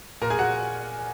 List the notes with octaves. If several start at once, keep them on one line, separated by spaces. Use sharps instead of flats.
A#2 A#4 A#5
G#4 G#5
F#4 F#5